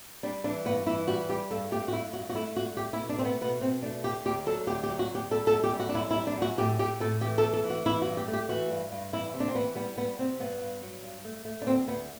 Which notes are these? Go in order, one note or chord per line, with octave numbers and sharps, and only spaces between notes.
G3 D4
E3 D4
G2 B3
E3 E4
G3 F#4
G3 G4
G2 A4
A3 G4
F#4
G2 E4
G2 F#4
F#4
A3 E4
G2 F#4
A3 G4
E4
B2
D4
A3 C4
B3
B2 B3
B2 C4
A3 D4
D2 G4
D2 G4
F#3 A4
D2 G4
G4
F#3
F#4
D2
G4
G3 A4
A4
F#2
G4
G3
F#4
D4
F#2 E4
E4
G3
D4
F#2 F#4
A2 G4
A2 G4
A2 A4
E3 G4
A4
A3
A4
E3
F#4
E3 E4
F#4
G2
G4
A3
G4
E3 F#4
G2
G2
E3 E4
C3
D4
C4
E3 B3
G3 B3
G3 B3
C3 C4
G2 B3
G2
F#3
G2
A3
A3
D4
D2 C4
D2 B3